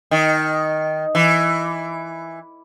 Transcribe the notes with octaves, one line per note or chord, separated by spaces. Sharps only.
D#3
E3